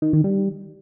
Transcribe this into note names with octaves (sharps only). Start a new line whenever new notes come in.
D#3
D#3
G3